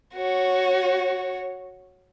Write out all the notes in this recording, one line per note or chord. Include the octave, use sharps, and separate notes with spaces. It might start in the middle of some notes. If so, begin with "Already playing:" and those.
F#4 C#5